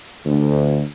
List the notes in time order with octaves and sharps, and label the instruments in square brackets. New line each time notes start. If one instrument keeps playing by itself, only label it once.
[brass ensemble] D2